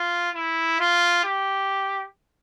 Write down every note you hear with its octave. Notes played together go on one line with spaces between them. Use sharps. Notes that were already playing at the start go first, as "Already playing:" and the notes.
Already playing: F4
E4
F4
G4